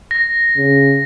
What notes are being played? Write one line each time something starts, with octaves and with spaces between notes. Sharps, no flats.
A#6
C#3